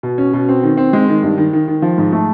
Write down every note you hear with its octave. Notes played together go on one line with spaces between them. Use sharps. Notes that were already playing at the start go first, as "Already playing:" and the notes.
B2
C#4
B2
C4
D#3
C4
G#3
D#3
G2
D#3
D#3
D#3
F3
G#2
A3